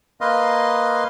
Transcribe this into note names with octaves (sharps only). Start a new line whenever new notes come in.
A#3 B4 D#5 F5 C6